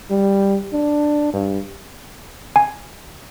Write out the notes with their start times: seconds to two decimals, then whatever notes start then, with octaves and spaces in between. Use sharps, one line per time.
0.10 G3
0.73 D4
1.33 G2
2.56 G#5